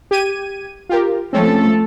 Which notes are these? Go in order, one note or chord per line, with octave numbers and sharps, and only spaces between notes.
G4 G#6 D#7
F4 G4 A#4
F3 A3 C4 C#4 A4